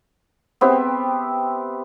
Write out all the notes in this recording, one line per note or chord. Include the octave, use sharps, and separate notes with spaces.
B3 C4 G4 E5